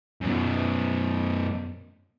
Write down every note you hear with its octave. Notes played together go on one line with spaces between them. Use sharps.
F#2 B2